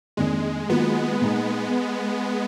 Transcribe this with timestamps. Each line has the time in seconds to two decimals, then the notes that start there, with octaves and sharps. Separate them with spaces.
0.17 F2 D#3 G#3 A#3 D4 G#4
0.69 D#3 F#3 A#3 B3 F4
1.21 A#2 G#3 D#4